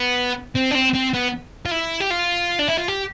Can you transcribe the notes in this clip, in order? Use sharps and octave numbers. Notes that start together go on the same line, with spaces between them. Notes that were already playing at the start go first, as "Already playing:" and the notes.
Already playing: B3
C4
D4
C4
C4
B3
F4
E4
G4
F4
D4
E4
F4
G4